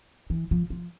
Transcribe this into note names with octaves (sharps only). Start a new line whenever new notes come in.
E3
F3
F3